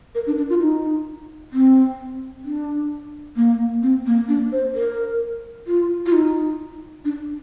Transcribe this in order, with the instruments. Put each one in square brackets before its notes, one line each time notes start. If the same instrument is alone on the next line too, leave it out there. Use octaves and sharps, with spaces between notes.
[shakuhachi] A#4
D4
D4
F4
D#4
C4
D4
A#3
C4
A#3
D4
C5
A#4
F4
F4
D#4
D4